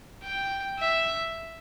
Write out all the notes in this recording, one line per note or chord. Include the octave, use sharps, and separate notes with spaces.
G5
E5